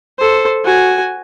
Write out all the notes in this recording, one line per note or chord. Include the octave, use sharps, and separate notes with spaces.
A4 C5
F#4 G#5